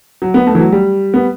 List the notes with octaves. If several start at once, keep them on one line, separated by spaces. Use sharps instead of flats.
F#3
B3
A3
E3
F#3
G3
B3